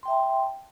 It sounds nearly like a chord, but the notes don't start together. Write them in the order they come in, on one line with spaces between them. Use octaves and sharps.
C6 G5 E5 A5